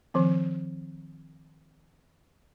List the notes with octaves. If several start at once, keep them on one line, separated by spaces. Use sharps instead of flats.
D#3 F3 C4